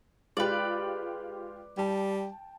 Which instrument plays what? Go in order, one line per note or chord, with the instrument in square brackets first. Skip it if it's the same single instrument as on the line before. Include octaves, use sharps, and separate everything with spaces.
[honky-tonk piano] G#3 F4 G4 [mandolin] B4 D5
[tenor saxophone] G3 [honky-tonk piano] G5 A5